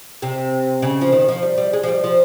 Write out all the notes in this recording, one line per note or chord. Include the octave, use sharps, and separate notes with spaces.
C3
C#3
F3
D#3
F3
G3
G3
G#3
F3
G3
F3